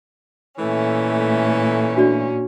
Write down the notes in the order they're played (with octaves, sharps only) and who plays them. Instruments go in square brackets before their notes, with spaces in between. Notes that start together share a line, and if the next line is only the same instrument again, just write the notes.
[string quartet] A#2 C#4 [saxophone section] E3 A3
[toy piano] D4 F#4 D5